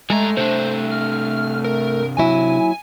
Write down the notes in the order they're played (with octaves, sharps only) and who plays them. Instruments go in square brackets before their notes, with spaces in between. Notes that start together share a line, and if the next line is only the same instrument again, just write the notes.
[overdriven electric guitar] G2 A#5 [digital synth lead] G#3 [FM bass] A3 [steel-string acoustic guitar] G#5
[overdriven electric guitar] C3 D4 [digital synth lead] C5
[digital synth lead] F6
A#4
[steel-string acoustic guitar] D#2 F#3 E4 [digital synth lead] G#5